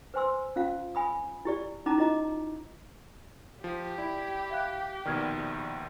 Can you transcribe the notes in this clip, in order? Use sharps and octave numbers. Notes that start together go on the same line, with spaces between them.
B4 C5 G#5 C6 E6
C#4 F4 F5
G#5 B5 D#6
E4 G4 D5
C#4 D#4 E4 A5 A#5 D6
E4 F4 D#5 A#5 D6
F3 G4
E4 D5
E5 F5 F#6
A#1 B2 D#3 D5 F6 G#6